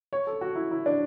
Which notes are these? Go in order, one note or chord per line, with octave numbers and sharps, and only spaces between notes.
C#5
A4
F#4
E4
E4
D4